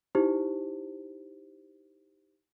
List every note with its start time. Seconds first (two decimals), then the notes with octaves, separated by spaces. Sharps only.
0.15 D#4 E4 G4 C5